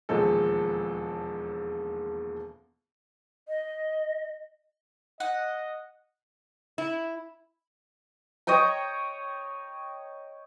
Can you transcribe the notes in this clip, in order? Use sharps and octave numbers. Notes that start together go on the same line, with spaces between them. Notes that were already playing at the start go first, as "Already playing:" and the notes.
E1 D#2 F3 G#3 A4
D#5
D#5 F#5
E4
C#5 D#5 G5 A#5